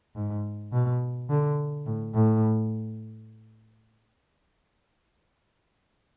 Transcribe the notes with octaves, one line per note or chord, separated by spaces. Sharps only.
G#2
B2
D3
A2
A2